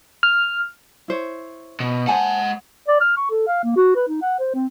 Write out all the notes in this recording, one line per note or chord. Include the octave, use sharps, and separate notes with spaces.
F6
E4 C5 C#5
B2
G#3 C5 F#5 G#5 A5
D5
F6
C#6
A4
F5
A#3
F#4
B4
D#4
F#5
C5
C4